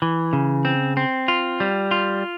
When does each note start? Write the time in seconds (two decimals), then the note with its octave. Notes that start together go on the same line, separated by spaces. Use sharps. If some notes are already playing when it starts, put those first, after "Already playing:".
0.02 E3
0.33 C#3
0.65 C4
0.97 C4
1.28 F4
1.60 G3
1.91 F4